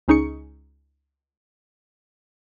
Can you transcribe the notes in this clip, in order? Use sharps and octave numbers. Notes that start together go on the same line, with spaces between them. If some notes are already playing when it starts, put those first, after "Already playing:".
C#2 C#4 D#4 G#4 C#6 C#7